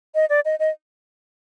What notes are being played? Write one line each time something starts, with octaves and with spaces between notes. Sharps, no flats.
D#5
D5
D#5
D#5